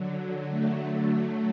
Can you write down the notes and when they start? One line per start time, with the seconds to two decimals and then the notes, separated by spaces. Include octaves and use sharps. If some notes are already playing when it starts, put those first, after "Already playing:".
Already playing: D3 F#3
0.22 D3 F#3
0.51 F#3 A3
1.08 F#3 A3